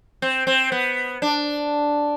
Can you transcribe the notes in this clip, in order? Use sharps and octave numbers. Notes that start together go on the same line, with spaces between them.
C4
C4
B3
D4